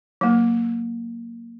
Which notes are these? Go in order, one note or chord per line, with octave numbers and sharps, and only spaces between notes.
F#3 A#3